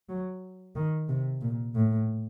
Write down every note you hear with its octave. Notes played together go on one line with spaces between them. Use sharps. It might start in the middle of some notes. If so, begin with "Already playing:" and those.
F#3
D#3
C3
A#2
A2